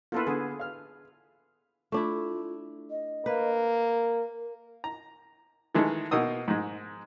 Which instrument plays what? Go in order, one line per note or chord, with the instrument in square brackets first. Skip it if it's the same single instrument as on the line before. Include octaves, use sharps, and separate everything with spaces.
[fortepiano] A#3 B3 E4 [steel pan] F4 A4 B4
[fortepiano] D3 B3 [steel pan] G#4
[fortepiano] F5 F6
[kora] A3 D4 E4 [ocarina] F4
[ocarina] D#5
[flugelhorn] A#3 [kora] B4
[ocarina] A#4
[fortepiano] A#5
D#3 E3 G#3 G#4 A4
B2 A#3 D#4 D#6 E6
G#2 G#3